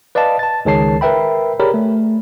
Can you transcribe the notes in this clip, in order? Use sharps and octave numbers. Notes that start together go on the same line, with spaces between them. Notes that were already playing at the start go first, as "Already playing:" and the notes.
B4 D5 D#5 F5 A5
A5 A6
C#2 D#3 G#4 C#5 A5 C7
A#4 B4 E5 G5 B5
G4 G#4 A#4 C#5 D5 B5
A3